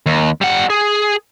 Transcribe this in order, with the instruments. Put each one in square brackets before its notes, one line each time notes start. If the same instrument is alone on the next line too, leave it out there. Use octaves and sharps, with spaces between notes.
[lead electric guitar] D#2
G3 F#5
G#4